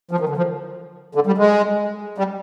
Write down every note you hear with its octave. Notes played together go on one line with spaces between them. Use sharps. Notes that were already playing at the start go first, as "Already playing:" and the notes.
F3
D#3
D3
F3
D3
G3
G#3
G3